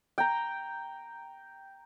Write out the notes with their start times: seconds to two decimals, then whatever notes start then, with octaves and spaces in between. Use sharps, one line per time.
0.18 G5 A#5